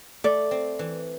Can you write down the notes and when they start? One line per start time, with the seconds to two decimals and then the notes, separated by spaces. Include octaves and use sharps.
0.24 A3 D5
0.51 C4
0.79 E3